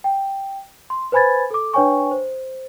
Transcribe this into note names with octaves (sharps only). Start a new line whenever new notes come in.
G5
C6
B4 C5 G#5 B5 G#6 A6
A4 D6
D4 B4 C#5 G5 G#5 C#6
C5